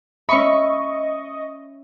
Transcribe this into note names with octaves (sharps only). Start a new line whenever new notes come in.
C#4 D#5 E5 B5 C#6